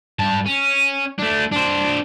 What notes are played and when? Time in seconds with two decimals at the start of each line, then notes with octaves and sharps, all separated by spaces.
0.19 G2 A5
0.46 C#4
1.19 A3 D4
1.52 D4 C5